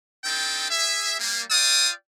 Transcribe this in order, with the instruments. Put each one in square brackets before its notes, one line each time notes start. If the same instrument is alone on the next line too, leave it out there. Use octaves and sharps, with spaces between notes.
[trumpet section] C4 D4 D#4 A4 G5
G#4 E5
G3 A#3
F4 D5 F5 G5 D#6